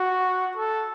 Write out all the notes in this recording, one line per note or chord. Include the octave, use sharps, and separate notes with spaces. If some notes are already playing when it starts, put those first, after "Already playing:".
Already playing: F#4
A4